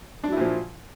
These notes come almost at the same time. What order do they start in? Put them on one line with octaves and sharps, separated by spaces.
D4 F#3 E4 A#2 F3